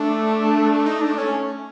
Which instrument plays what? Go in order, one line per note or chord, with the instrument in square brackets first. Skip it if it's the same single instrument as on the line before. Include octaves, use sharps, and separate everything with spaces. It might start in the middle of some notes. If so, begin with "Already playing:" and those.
Already playing: [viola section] A3 [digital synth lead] D4
[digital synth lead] D#4
D4
C#4